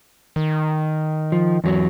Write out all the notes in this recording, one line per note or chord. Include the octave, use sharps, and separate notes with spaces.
D#3
F3
E2 F#3